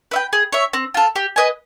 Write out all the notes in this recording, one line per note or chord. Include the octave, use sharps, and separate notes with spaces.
B4 E5 G5
G#4
C#5 E5
C4
F4 A4
G4
B4 D#5 G#5